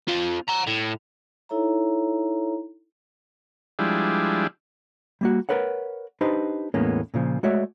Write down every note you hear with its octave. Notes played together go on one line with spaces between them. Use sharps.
C4 F4
F#5 A#5
A2
D#4 E4 A4 C#5 E5 A#5
F3 G3 G#3 D4 E4
G3 A#3 F#4
A#4 B4 C#5 F#5
D4 D#4 G4 B4 C5 D#5
E2 A2 G#3 A#3 B3 C#4
A#2 C#3 F3
G#3 A3 F#4 C#5 D5 E5